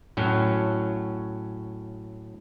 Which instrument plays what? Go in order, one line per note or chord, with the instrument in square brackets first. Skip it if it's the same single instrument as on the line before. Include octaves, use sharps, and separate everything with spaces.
[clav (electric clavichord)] A2 F#3 C#4